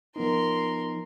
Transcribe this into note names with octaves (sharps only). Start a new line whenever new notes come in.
F3 B3 D#4 A#4 C6